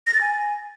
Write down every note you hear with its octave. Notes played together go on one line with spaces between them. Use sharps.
A#6
A6
G#5